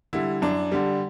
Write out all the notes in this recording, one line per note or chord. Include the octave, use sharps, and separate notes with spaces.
D3 G3 E4
F#2 D4
D3 G3